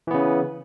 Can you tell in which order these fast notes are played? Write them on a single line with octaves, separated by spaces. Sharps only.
E3 B3 C#3